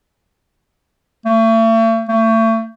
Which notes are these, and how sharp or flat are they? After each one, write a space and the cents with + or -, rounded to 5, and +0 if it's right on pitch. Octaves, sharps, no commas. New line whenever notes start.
A3 +40
A3 +35